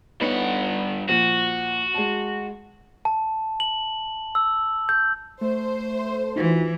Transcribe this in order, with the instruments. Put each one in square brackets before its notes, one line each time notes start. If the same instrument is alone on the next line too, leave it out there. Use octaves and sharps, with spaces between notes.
[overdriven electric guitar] G2 F#5 [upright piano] B3 D#4 C#5
[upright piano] A#2 F3 [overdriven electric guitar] F#4
[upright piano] G#3 A5
[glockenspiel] A5
F#7
E6
G6
[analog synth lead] A3 [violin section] C5
[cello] E3 [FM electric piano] D#4 F4 F#4